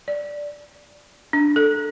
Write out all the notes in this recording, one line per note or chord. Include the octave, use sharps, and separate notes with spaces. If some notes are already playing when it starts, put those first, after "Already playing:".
D5
D4
A4